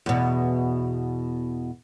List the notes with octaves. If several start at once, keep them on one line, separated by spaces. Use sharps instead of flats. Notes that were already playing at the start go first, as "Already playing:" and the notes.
E2 B2